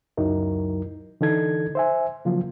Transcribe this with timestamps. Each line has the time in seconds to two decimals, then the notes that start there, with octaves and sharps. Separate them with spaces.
0.17 C#2 F#2 F#3 D#4 E4 A#4
1.21 D3 E3 D#4 A4 G#6
1.75 C5 E5 G#5
2.25 C#3 F3 F#3 A#3 F4